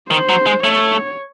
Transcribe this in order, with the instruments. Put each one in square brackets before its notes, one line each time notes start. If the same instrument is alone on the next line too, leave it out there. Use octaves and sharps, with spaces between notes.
[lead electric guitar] D#3 [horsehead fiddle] C5
[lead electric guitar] F#3
G#3
[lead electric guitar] A3 [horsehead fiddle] C#5